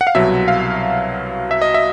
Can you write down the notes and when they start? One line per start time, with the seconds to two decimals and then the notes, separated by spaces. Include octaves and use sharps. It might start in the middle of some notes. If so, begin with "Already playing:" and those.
0.01 F#5
0.07 F5
0.15 C2 B2 F#3 E5
0.48 F5
1.51 E5
1.62 D#5
1.74 E5